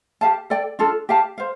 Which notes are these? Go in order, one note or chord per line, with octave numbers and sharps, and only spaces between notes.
G4 F5 A5
A4 D5 G5
D4 F4 A4
G4 F5 A5
C5 F5